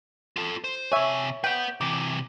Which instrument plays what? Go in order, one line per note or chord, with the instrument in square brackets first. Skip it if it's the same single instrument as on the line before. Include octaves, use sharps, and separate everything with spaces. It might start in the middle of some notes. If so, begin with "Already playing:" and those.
[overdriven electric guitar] F4 A4
C5
[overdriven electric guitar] C3 G#5 [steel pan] C#5 E5
[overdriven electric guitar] B4 F#5 [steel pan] G5
[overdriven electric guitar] C3 E3 [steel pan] D6